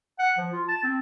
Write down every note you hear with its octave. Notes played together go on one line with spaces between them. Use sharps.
F#5
F3
F4
A5
C4